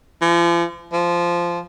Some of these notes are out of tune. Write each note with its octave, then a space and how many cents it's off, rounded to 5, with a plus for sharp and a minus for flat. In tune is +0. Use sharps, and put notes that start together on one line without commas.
F3 -40
F3 -10